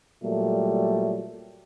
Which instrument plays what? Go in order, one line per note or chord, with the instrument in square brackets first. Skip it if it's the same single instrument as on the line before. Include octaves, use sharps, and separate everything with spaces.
[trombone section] A#2 F#3 G3 A3